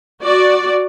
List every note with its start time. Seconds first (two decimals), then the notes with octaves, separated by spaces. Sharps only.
0.23 F#4 D5